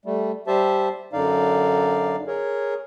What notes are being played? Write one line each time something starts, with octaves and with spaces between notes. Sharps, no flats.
G3 A3
G3 G4 C5 E5 A5
F#2 D3 D#4 D5 F5
G#4 A#4 C#5